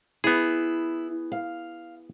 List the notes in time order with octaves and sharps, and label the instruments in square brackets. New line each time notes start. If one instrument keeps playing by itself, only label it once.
[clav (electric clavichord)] B3 G#4 [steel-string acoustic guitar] E4
[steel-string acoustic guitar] F5